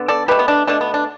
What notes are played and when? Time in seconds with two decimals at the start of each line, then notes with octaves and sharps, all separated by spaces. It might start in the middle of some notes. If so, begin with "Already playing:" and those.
Already playing: D3 B3
0.08 A4 D5
0.28 B2 A3 G4 B4
0.39 B3
0.48 D4
0.67 B2 A3 D4
0.81 B3
0.94 D4